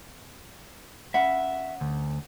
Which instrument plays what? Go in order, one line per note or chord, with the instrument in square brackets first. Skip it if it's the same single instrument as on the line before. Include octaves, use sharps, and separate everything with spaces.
[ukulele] C#4 F#5 B5 [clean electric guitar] E5
[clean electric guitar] D2